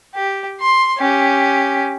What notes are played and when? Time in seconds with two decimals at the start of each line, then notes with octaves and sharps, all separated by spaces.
0.15 G4
0.61 C6
0.98 C#4 G4